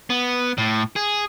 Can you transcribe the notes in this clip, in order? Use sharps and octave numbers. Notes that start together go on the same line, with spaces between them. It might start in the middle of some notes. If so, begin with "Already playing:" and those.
B3
A2
G#4